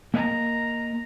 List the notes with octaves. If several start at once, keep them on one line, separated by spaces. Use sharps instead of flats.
A#3 A#4 D#5 A#5